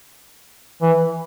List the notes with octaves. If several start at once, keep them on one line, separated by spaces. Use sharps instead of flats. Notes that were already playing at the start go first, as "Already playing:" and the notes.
E3